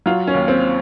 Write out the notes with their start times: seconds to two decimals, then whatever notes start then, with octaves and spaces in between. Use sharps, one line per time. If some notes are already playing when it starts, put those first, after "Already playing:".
0.06 F#3 F4
0.27 C#4
0.34 D#2
0.48 C4